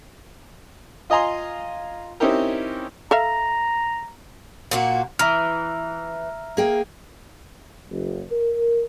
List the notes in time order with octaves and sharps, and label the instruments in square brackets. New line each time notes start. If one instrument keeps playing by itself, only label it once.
[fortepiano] F4 D#5 G#5 A#5 C6
C4 C#4 D#4 E4 G4 A#4
[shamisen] A4 E5 F5 [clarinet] A#5
[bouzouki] A#2 A#3 F#4
[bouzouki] E3 [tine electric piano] E5 A#5 F6
[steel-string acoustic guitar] A#3 G#4 G5
[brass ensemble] F#1
A#4